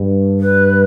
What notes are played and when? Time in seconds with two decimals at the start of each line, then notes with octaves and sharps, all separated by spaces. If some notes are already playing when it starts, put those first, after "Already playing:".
Already playing: G2
0.40 B4